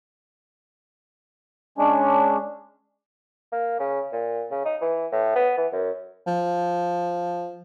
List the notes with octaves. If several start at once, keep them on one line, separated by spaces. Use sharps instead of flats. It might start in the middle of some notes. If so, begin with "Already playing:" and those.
G#3 C#4 D4
A#3
C#3
A#2
C#3
D#4
E3
A2
B3
E3
F#2
F3